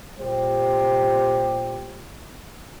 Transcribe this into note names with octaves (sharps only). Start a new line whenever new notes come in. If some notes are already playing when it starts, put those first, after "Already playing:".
A#2 G3 G4 C5